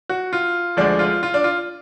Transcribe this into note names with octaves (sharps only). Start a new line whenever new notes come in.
F#4
F4
D2 D3 F3 G#3 D4
F4
F4
D4
F4